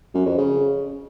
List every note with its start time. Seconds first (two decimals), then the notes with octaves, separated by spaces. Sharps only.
0.14 F#2
0.26 F2
0.37 C#3